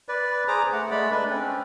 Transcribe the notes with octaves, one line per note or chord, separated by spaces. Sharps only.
B4 D5
G#4 C5 A#5 D6
A3 F#5
G#3 A3 D5 B5
D4 B4 D5
C4 C#4